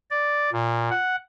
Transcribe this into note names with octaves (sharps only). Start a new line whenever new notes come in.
D5
A#2
F#5